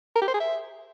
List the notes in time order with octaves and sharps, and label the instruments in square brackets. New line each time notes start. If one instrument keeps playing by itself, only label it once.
[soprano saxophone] A#4
G4
C5
G#4
E5